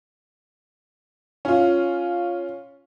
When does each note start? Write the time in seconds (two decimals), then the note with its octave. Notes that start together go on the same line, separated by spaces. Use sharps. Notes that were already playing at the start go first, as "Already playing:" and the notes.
1.45 C#4 F4